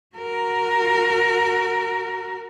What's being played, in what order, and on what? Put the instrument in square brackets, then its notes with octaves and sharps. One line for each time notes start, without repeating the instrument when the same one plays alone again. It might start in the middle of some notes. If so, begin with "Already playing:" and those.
[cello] F#4 A#4